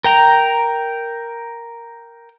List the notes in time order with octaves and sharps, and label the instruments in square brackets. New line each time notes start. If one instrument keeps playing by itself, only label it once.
[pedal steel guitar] A#4 G5 A#5